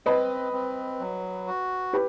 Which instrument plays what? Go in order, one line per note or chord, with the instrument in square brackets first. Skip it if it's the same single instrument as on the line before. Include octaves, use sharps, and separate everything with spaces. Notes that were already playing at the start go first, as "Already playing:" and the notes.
[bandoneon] C4 [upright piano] B4 D#5
[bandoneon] C4
F#3
F#4
[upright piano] G4 B4